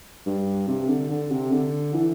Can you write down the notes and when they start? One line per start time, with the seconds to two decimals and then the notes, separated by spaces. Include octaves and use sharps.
0.26 G2
0.68 C3
0.89 D3
1.10 D3
1.31 C3
1.52 D3
1.94 E3